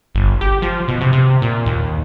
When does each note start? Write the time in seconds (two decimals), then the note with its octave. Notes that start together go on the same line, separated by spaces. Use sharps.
0.15 G1
0.41 G4
0.62 F3
0.88 B2
1.01 C3
1.13 C3
1.42 A#2
1.66 D#2